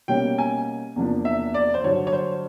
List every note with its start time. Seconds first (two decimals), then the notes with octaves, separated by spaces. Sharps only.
0.08 B2 G3 A#3 C#4 G5
0.38 G#5
0.96 E2 C3 F3 A#3 D4
1.25 E5
1.54 D5
1.74 C5
1.84 G2 D3 F#3 C#5
2.07 C#5
2.12 C5